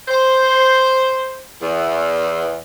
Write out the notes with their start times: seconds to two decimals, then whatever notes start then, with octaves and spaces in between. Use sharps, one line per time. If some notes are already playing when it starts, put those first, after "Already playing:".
0.08 C5
1.61 E2